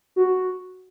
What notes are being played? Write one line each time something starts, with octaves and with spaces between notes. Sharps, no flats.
F#4